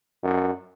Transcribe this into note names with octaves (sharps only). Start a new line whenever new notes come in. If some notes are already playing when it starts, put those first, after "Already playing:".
F#2